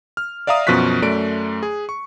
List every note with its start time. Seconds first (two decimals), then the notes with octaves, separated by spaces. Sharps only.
0.17 F6
0.47 D5 E5 F5 A#5 D#6
0.67 F#2 B2 F3 C#6 F#6 B6
1.02 F#2 A3 D5 D7
1.63 G#4
1.89 C#6